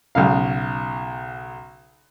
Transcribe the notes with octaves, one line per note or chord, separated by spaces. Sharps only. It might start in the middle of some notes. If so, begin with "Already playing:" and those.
B1 C#3 F5